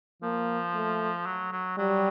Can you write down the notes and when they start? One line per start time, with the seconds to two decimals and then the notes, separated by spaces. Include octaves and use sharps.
0.22 F3 A#3
0.74 A3
1.26 F#3
1.52 F#3
1.78 F#3 G3